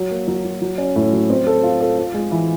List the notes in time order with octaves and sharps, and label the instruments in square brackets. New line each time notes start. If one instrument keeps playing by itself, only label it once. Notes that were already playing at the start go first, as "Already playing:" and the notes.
Already playing: [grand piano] F#3
A#3
F#3
F#3
F#3
C#4
A2
F#3
C4
A4
F4
A4
F4
G#3
E3